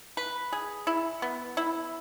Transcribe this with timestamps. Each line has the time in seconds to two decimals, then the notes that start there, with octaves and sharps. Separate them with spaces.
0.17 B4
0.52 G#4
0.87 E4
1.22 B3
1.57 E4